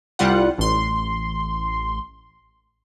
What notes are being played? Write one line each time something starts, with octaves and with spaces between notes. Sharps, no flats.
C2 G3 F4 F#5
A1 C6